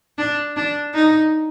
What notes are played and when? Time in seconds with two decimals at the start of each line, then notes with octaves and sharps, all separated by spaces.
0.18 D4
0.57 D4
0.94 D#4